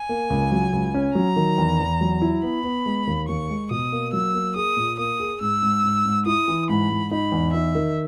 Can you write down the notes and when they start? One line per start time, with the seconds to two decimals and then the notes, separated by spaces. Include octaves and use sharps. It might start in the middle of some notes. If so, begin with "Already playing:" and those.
Already playing: G#5
0.09 A#3
0.30 C#2
0.52 F#3
0.73 C#2
0.94 C#4
1.15 F#3 A#5
1.36 D#3
1.58 E2
1.80 E2
2.01 F#3
2.22 E4
2.43 B3 B5
2.64 B3
2.86 G#3
3.07 D#2
3.28 D#2 C#6
3.50 G#3
3.71 B2 D#6
3.92 A#3
4.13 F#3 E6
4.34 A#3
4.56 G#4 D#6
4.77 A#2
4.98 A#3 D#6
5.20 G#4
5.41 G#2 E6
5.62 G#2
5.84 G#2
6.05 G#2
6.26 E4 D#6
6.48 E3
6.69 G#2 B5
6.90 G#2
7.11 D#4 B5
7.32 E2
7.53 D#4 E5
7.75 D#3